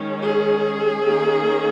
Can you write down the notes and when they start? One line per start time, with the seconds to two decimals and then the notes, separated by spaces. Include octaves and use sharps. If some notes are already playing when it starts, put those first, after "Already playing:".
Already playing: D#3 G#3 C#4
0.25 G#4
1.01 D#3 A#3 C#4